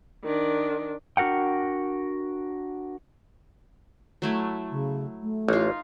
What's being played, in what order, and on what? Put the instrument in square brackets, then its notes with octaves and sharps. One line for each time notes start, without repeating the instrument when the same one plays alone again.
[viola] D#3 D4
[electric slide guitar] D4 F#4 A#4 F#5 G5
[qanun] F#3 A3 E4
[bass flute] C#3
A3
[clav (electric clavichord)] A1 [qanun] D#4 F4